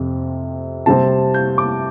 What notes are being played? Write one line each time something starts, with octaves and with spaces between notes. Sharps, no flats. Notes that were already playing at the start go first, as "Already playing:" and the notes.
Already playing: F2 C3
C3 G3 C4 A5
G6
D6